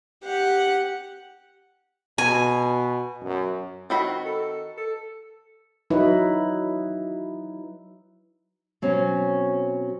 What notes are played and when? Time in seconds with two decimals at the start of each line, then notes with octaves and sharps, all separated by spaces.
0.22 G4 F#5
2.18 B2 G#5
3.24 F#2
3.90 D#3 C4 F#4 B5
4.26 A4
4.77 A4
5.90 F#3 D#4 E4 B4
8.82 B2 F#3 C4 C#4